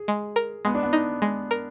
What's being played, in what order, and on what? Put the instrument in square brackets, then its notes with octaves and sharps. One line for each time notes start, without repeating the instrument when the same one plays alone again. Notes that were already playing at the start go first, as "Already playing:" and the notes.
Already playing: [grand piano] G#4
[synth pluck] G#3
A#4
[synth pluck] G#3 [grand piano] B3
[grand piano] D4
B3
[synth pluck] D#4
G#3
A#4